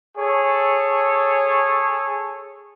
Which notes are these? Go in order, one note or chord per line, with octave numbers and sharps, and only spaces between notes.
G#4 A4 C#5